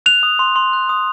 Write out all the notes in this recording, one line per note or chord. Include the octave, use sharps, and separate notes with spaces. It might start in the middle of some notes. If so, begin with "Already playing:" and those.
F#6 F7
D#6
C6
C6
F#6
D#6